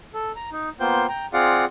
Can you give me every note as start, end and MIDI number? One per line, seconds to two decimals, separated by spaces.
0.14 0.32 69
0.36 0.50 82
0.52 0.70 63
0.80 1.06 58
0.80 1.06 59
0.80 1.06 65
0.80 1.06 72
0.80 1.06 79
0.80 1.06 91
1.09 1.26 79
1.09 1.26 82
1.33 1.65 60
1.33 1.65 65
1.33 1.65 68
1.33 1.65 74
1.33 1.65 77
1.33 1.65 78